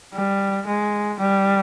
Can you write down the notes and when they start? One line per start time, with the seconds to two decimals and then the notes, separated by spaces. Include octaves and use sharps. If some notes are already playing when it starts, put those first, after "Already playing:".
0.14 G3
0.67 G#3
1.19 G3